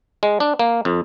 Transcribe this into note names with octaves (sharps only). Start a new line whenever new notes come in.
G#3
D4
A#3
F2